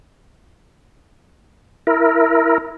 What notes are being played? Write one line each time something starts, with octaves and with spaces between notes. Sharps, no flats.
E4 A#4